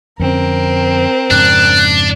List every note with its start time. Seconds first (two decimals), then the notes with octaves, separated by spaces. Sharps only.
0.20 F2 D3 C4 C#4 A#4
1.31 F2 G#2 C#3 D4 F#6